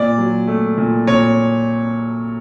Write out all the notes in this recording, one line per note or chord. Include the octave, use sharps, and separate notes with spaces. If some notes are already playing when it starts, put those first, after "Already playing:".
Already playing: A#2 D5
F#3
A3
A#2
A#2 C#5